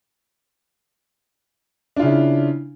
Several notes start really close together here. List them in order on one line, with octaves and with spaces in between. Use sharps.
D4 F4 C#3 E4